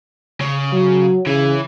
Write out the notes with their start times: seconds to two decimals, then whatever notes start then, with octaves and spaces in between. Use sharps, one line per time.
0.41 C#3
0.73 F#3
1.27 C#3 E3